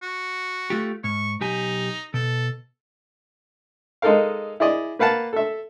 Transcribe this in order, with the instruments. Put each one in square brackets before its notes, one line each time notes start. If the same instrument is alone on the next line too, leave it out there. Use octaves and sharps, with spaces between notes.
[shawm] F#4
[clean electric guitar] A3 F4 G4
[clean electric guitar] G#2 [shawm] C#6
[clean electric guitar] B1 G4 G#5 [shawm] D#4
[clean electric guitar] B2 [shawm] A4
[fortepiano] G#3 D#4 A4 A#4 F5
E4 G#4 D5 D#5
A#3 B4 F5 F#5 A5
A4 E5